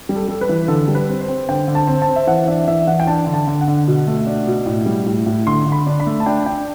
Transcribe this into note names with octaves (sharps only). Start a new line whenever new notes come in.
G3
A4
G3 A4
B4
E3
D3 A4
G3
B4
C4
C5
C4
D3 G5
D3
A5
C4
A5
C4
E5
E3 F#5
D4 E5
E3 E5
E3 F#5
G5
D4 A5
D3
A5
D3
F#5
D3
B2
A3
D4
B2
A2
G3
A2
A2
D3 C6
D3
B5
D4
B5
A3
A5
D4 G5
D4 G5